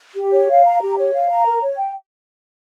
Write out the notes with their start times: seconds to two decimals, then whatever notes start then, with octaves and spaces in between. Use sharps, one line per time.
0.15 G4
0.32 C#5
0.49 F5
0.64 A#5
0.81 G4
0.97 C#5
1.13 F5
1.29 A#5
1.45 A#4
1.61 C#5
1.77 G5